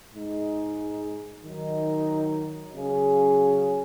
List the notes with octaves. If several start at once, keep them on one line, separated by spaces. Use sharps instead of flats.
G#2 G#3 D#4 G#4
D#3 F#3 D#4
C#3 F#3 C#4 G#4